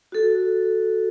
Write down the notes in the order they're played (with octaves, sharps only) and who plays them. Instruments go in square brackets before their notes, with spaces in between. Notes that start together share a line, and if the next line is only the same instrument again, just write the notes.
[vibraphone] F#4 A4